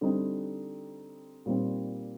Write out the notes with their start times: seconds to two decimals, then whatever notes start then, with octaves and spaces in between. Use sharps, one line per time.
0.01 D3 G3 C4 D#4
1.46 A#2 G3 C4 D#4